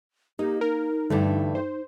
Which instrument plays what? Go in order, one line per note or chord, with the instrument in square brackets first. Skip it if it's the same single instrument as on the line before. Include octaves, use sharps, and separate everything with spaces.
[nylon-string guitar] A#3 [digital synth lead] D#4 [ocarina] G4
[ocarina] D#4 [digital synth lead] A#4
[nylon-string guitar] G2 E3 A3 [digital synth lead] D3
[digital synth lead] C5